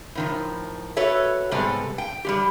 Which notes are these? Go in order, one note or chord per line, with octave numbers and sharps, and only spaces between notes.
A2 D#3 F3
F#4 A4 B4 C#5 E5
G#2 C3 G3 B3 A4
G5
G3 G#3 G4